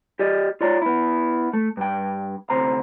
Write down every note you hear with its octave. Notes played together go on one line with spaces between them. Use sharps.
G4 D5 D#5
F4 C#5 D5 A#5
B3 E4
A3
G2 G5
D2 C3 C5 A#5